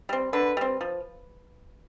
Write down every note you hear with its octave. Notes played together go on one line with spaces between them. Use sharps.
G3 C4
D3 B4
G3 C4
F3